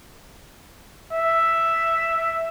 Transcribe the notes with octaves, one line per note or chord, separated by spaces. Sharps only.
E5